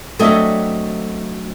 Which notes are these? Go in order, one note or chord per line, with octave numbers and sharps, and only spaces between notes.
F#3 A3 C4 D4 D#5 E5